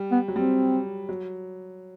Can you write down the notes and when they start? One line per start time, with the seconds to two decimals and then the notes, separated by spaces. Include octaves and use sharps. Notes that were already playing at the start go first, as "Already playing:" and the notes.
Already playing: G3
0.12 B3
0.28 F#3
0.36 G3 C4
1.09 F#3